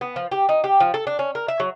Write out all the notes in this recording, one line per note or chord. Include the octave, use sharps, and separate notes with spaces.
B3
F3
G4
D#4
G4
F3
A4
D4
C#4
A#4
E5
F#3